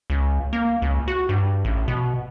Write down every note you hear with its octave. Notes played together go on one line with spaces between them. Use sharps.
C#2
A#3
C#2
F#4
G2
A1
B2